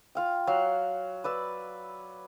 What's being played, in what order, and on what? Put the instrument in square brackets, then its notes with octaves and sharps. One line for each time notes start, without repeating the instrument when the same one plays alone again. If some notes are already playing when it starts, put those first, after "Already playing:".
[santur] F4 F5 G5
[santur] F#3 [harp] F5 F#6
[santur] B4 D5 E6